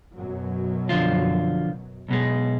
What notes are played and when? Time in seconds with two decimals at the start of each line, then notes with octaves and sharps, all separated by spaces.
0.18 F#2 B2 F#3
0.89 D3 F3 F4
2.08 B1 B2 G#3